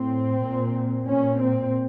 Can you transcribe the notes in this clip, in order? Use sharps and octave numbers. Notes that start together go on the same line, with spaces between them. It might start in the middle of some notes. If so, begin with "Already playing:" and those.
Already playing: A2 C4
A#2
A#2 C#4
C4